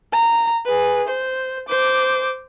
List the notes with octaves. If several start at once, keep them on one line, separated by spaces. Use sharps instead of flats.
A#5
G#4 B4
C5
C5 D6